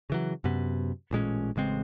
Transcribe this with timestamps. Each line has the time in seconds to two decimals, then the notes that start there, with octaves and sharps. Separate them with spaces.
0.10 C#3 E3 F#3
0.44 F#2 C3 B3
1.11 A1 A#2 G#3 C#4
1.56 A1 C#3 G#3 C4